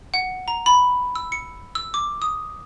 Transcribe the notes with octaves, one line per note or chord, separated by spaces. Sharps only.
F#5
A#5
B5
E6
C#7
E6
D6
D#6